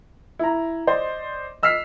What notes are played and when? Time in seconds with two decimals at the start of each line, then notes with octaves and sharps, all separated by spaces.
0.39 E4 A#5
0.87 C5 D5 D#5 C6
1.63 D#5 E6 F6 B6 C7